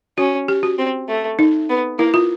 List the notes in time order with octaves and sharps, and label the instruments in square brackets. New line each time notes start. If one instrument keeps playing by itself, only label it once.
[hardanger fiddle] C#4 [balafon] F#4
[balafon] G4
F#4
[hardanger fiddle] C4
A3
[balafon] D#4
[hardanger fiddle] B3
[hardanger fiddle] A#3 [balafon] E4
[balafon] F4